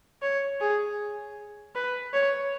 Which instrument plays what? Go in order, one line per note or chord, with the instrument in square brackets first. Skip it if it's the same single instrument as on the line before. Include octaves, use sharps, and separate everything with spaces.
[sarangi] C#5
G#4
B4
C#5